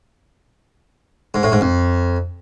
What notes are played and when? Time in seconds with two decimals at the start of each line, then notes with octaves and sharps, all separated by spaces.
1.34 G#2
1.43 A2
1.52 G#2
1.61 F2